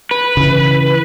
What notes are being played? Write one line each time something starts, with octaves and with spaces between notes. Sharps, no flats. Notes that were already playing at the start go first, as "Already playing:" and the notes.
B4
C#3 E3